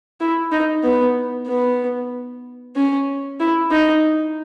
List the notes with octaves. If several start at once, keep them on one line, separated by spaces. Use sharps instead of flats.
E4
D#4
B3
B3
C#4
E4
D#4